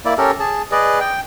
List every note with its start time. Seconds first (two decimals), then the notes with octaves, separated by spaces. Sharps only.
0.05 A#3 E4 D5
0.18 C#4 G4 A4 A#4
0.40 G#4 A5
0.72 G#4 B4 D5 D#5
1.00 G5